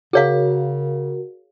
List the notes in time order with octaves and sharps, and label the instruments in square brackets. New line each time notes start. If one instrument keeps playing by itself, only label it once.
[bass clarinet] C#3 [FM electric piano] F#4 A#4 [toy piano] G#4 C#5 F5